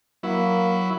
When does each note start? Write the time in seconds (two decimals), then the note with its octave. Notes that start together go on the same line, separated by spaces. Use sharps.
0.23 F#3 A#3 E4